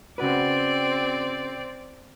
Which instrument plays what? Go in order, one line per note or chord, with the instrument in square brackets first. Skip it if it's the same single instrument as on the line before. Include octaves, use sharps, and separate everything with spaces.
[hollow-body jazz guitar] C#3 F#4 B4 [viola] C4 D5